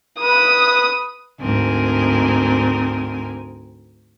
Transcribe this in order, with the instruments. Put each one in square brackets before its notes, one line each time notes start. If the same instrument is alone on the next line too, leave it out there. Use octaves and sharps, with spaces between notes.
[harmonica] B4 [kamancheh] D#6
[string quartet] D2 G#2 C4 A#4 G#5